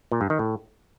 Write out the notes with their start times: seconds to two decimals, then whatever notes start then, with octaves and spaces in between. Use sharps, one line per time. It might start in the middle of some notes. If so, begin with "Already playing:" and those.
0.12 A#2
0.21 G2
0.30 D#3
0.39 A2